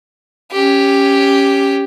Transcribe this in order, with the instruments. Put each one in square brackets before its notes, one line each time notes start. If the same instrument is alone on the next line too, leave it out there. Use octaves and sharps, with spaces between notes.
[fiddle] C#4 G4